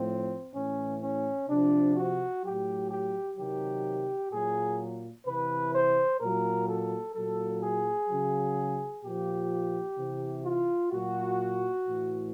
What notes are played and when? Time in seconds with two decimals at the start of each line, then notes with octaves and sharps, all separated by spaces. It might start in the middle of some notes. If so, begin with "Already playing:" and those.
Already playing: A2 F3 C4
0.54 A2 E3 C#4
1.02 C#4
1.49 C3 F3 D4
1.97 F#4
2.43 A2 F#3 G4
2.90 G4
3.37 C3 D#3 F#3 G4
4.31 A#2 F#3 G#4
5.26 C3 E3 B4
5.73 C5
6.20 A#2 F#3 A#4
6.68 A4
7.15 A#2 F#3 A4
7.62 G#4
8.09 C#3 F#3
9.03 A#2 F3 G4
9.97 C3 E3
10.45 F4
10.91 A#2 F#3 F#4
11.86 A2 E3